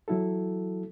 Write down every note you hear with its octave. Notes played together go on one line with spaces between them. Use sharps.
E3 F#3 E4 F#4 A4